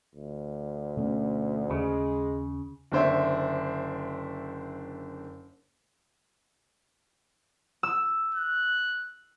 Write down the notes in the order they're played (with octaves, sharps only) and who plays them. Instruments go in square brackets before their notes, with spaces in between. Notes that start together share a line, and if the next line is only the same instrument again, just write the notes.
[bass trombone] D2
[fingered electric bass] B2 A3 C#4
[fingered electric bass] D#2 [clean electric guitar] C#3 [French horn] G#3
[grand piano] F#1 D3 D4 C5 C#5 E5
[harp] E6
[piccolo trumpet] F#6